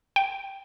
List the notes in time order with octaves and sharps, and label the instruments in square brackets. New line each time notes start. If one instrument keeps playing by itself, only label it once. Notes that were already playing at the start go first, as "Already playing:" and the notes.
[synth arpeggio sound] G5